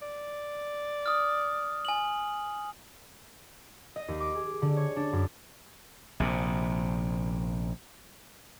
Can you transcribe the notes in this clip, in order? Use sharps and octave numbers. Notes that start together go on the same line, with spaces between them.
D5
D#6 F6
G#5 F#7
D#5
D#2
D6
G#4
D3
C#5
D4
F#2
A#1 C3